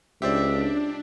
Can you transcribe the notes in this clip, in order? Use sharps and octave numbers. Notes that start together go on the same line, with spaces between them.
C#2 D4 G4 C5 D5 E5